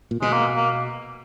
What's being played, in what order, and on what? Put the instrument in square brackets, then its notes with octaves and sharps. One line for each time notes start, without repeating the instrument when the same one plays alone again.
[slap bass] A#2
[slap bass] B2 [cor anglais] G#3
[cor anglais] A#3
A#3